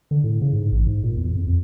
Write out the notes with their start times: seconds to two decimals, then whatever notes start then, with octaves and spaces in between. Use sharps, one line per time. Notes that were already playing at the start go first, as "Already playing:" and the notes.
0.11 D3
0.24 A2
0.42 C#3
0.53 G#2
0.72 A1
0.87 G#2
1.04 A#2
1.17 E2
1.36 F2
1.47 F2